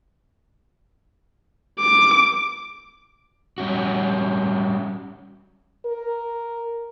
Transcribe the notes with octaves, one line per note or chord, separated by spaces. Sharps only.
D6
G3 C#4 F#4
A#4